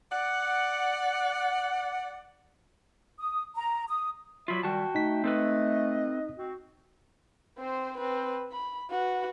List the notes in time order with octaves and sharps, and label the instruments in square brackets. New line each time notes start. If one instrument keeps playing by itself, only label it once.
[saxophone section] D5 F#5
[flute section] D#6
A#5
D#6
[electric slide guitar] F#3 F4 [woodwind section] D5 E5 B5
[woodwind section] D#3 G3 [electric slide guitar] F#4 A5 [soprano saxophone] G5
[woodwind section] A3 [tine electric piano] D#4 B6
[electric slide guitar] C4 A4 B4 [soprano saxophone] D#5
[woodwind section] C4 F#4
[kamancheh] C4 C5
C4 B4
B5
F#4 B4